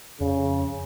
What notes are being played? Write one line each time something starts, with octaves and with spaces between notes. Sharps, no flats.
F2 C#3